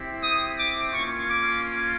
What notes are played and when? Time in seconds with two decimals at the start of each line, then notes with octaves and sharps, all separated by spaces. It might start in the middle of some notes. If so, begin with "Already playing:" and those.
Already playing: C4 E4 G4
0.22 D#6
0.58 D6
0.93 A#3 C#4 F4 C#6
1.29 D6